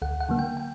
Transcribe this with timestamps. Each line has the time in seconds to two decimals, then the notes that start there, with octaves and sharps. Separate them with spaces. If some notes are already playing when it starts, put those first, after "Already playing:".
0.02 D2 F#5
0.20 F#5
0.29 D3 F#3 A#3
0.39 G5
0.57 G5